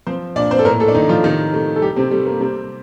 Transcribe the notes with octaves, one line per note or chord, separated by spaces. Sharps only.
F3 C4 C5
A#2 D4 D5
C4 C5
A4
A2 A#3 A#4
A3 A4
D4
A2 D#3 D#4
F3 F4
C3 D#3 D#4
C3 A3
A4
G3 G4
C3 C4
G3 A3
A#3
C3 G3 C4